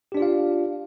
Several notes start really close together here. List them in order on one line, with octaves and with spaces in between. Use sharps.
G4 D4 D5 F4 F5